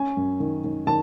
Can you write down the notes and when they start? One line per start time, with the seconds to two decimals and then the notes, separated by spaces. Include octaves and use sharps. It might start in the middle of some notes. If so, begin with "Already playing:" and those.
Already playing: C#4 G#5
0.17 F#2
0.40 D#3
0.64 D#3
0.87 D#3 A5